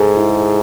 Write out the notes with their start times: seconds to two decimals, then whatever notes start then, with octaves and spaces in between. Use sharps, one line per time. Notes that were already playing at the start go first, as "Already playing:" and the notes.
Already playing: G#2 G#4 A4
0.17 E4